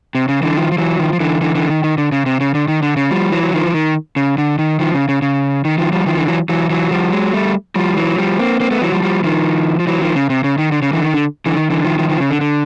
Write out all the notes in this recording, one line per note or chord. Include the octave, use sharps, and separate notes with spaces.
C3
C#3
D3 E3
D#3 F3
F3
E3 F#3
D#3 F3
F3
D3 E3
D3 E3
D3 E3
D#3
D#3
D3
C#3
C3
C#3
D3
D#3
D3
C#3
F3 G3
E3 F#3
F#3
D#3 F3
E3
D#3
C#3
D3
D#3
D#3 F3
C#3
C#3
C#3
D#3
D#3 F3
F3 G3
D#3 F3
D3 E3
E3 F#3
E3 F#3
E3 F#3
F3 G3
F#3 G#3
G3 A3
F3 G3
E3 F#3
F3 G3
A#3 C4
A#3 C4
A3 B3
E3 F#3
F3 G3
F3 G3
D#3 F3
F3
E3 F#3
D#3 F3
C#3
C3
C#3
D#3
D3
C#3
D3 E3
D#3
D3
D3 E3
D#3
D3 E3
D#3 F3
D#3 F3
D#3 F3
C#3
D3
D3